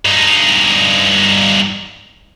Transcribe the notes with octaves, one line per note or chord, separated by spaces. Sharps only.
G2 D#4